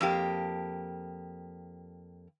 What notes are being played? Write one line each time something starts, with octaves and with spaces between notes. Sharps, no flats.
F2 A#3 G4